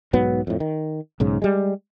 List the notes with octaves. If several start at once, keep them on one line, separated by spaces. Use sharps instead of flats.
B1 G#2 F#3 B3
F2 A2
D#3
B1 G#2 C#3
G3 G#3